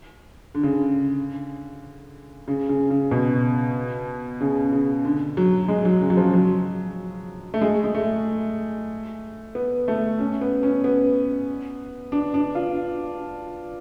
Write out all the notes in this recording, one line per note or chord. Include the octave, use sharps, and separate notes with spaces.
D3
C#3
D3
C#3
C#3
C#3
B2
C#3
C#3
D3
F#3
G#3
F#3
C#3
F#3
F3
F#3
A3
G#3
G#3
A3
B3
A3
C#4
B3
C#4
B3
D4
D4
F4